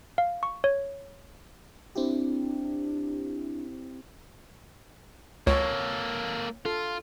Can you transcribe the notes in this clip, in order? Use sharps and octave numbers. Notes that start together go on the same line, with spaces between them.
F5
C#6
C#5
C4 D4 E4 G4
C#2 A#3 A4 C#5
F4 A4